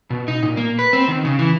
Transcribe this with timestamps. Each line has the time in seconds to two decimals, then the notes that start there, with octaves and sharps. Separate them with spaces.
0.10 B2
0.28 D#4
0.43 A#2
0.57 A#3
0.79 B4
0.93 C4
1.08 D#3
1.25 C#3
1.39 E3